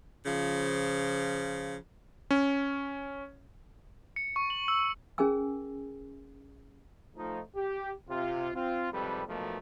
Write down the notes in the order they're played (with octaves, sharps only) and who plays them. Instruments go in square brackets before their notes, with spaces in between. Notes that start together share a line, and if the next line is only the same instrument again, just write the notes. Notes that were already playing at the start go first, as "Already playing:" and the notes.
[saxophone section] C#3 F3
[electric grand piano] C#4
[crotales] C#7
C#6
F#7
E6
[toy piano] C#4 G#4 A#4 G#5 E6
[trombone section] F3 A3 D#4
G4
C3 F4
C4 F4
F2 G#2 C3 G3 A4 B4
B1 B2 F3 A3 A#3